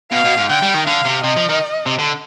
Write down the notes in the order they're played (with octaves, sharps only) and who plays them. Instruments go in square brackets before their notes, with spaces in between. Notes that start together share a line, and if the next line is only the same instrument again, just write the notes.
[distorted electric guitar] B2 [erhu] F5
[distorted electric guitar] B2
G#2
[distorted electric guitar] D3 [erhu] G5
[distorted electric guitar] G3
D#3
[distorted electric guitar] D3 [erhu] F5
[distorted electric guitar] C3
[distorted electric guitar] C3 [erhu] D#5
[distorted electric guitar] F3
D#3
C3
D3